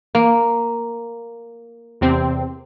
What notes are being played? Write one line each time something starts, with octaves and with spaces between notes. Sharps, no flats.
A#3
E2 C3 C4